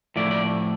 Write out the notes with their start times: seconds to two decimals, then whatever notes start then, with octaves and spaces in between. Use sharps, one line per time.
0.16 A2 F3 A3 D5
0.31 D5